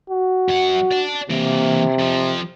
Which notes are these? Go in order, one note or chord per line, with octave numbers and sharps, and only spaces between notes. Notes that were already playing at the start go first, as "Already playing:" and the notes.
F#4
F#2 F#5
D5 A5
C3 E3 A#3
F2 F3